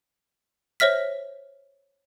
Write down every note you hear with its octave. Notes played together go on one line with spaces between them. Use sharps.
C5 C#5 E5 F6 B6